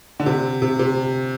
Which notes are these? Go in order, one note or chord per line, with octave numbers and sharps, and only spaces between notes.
D3
C3
C3
C3